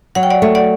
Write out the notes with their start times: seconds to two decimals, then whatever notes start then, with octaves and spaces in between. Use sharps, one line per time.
0.15 F#3 F#5
0.23 G5
0.30 D5 F#5
0.42 A3
0.55 D5 F#5